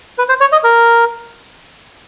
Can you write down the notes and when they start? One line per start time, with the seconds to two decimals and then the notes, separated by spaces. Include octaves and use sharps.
0.18 B4
0.29 C5
0.41 C#5
0.52 D#5
0.64 A#4